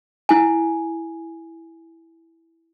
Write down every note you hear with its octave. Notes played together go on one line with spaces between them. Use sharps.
E4 G#5